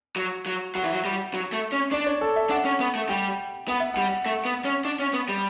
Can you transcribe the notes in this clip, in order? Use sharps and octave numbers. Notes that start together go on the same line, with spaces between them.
F#3
F#3
F#3 F#5
E3
F#3
G3
F#3
A3
C#4
D4 D5
C#5
A4
E5
D4 F#5
C#4
B3
A3
G3 G5
B3 F#5
E5
G3 F#5
A3
B3
C#4
D4
C#4
B3
G3